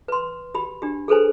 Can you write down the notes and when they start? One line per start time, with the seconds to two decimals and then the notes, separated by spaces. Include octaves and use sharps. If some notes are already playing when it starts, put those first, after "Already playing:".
0.08 B4 C6
0.55 G4 B5
0.82 D4 G4
1.08 G#4 A4 B4 C5 G#5